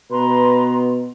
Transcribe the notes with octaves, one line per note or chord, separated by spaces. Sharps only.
B2 B4 A#5 C6